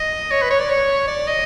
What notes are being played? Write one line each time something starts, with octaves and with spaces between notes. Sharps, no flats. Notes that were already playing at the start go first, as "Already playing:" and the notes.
Already playing: D#5
C#5
B4
C#5
D5
C#5
D5
D#5